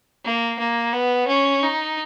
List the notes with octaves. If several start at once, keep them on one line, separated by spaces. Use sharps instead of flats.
A#3
A#3
B3
C#4
D#4